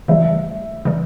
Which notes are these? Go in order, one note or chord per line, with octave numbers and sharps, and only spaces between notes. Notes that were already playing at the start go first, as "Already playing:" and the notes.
C#3 E3 G3 E5
C#3 E3 G3